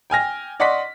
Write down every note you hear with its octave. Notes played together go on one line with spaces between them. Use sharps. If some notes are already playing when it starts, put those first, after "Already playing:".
G5 G#5 F6 A#6
D5 D#5 F#5 C6 C#6 B6